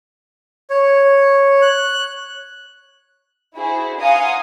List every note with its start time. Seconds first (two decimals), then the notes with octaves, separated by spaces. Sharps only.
0.70 C#5
1.62 F#6
3.55 E4 F#4 G#4 C5
4.00 F5 F#5 G#5 A#5 C6 D#6